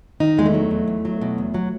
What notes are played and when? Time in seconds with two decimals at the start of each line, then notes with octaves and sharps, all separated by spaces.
0.20 D#3 D#4
0.37 E2 G#3
0.46 A3
0.54 F#3
0.71 E2
0.88 E2
1.05 F#3
1.21 B2
1.38 E2
1.54 F#3